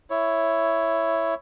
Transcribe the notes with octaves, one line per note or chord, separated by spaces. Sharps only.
E4 C#5